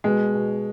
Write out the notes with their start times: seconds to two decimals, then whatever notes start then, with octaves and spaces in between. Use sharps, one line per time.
0.04 B2 G#3
0.34 B2